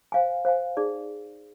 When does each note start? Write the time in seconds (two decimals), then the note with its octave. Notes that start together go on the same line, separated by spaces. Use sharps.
0.12 C5 F5 G#5
0.45 C5 F5 G#5
0.77 D#4 G#4 D5